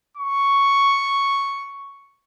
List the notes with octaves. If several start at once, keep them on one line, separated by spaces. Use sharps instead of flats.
C#6